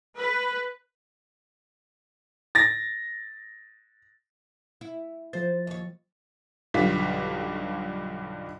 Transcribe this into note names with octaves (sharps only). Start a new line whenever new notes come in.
B4
A6 A#6
E4
F3 C5 A6
D#2 C#5
B1 G2 D3 F4 B6